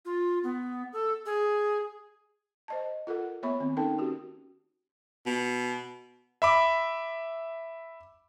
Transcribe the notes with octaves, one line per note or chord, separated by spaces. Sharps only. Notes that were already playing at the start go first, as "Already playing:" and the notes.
F4
B3
A4
G#4
C5 D#5 A5
F4 A4 A#4 F#5
A#3 B3 C#5 E5 B5 C#6
D#3 C4
C#4 D#4 A4 A#4 G5 A5
C#4 F#4 G4
B2
E5 B5 D6